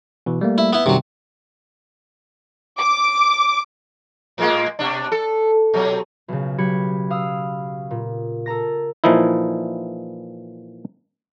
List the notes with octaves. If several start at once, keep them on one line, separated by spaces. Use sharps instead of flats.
B2 E3
G3 A3 A#3
E4
B3 E4
F#2 C3 D#3 F#3 G3
D6
A2 G#3 A#3
B2 D4
A4
B2 F#3
B1 C#3
F#3 G4 B5 G#6 C#7
F5 D#6 E6
A#2
A4 A#4 A#5 A#6
A#2 E3 F3 D#4 E4